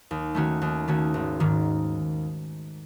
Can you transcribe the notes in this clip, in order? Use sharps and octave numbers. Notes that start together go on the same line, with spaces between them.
D#2
D#3 A3 C#4 F#4
D#2
D#3 A3 C#4 F#4
G#1
G#2 D#3